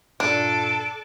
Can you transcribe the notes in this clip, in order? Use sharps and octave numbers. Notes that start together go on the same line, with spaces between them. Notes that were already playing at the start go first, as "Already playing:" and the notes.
G2 A#2 D4 A4 D7